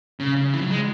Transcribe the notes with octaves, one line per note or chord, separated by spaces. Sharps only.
C#3
C#3
E3
F#3
G#3